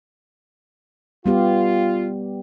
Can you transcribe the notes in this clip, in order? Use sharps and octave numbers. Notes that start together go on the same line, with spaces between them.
G3 B3 F4 G4